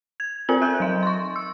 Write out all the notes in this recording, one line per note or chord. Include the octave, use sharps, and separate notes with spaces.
G#6
C4 F4 A#4 C5 G#5 F#7
E5 F#6 G6
F#3 D#5 G6
C6 C#6
E6